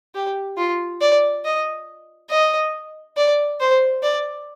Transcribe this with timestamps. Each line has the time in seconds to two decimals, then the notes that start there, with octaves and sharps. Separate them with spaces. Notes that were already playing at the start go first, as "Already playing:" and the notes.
0.15 G4
0.57 F4
1.01 D5
1.45 D#5
2.30 D#5
3.17 D5
3.60 C5
4.03 D5